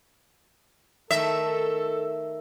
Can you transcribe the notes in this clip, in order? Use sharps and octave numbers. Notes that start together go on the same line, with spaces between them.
D#3 A3 A4 E5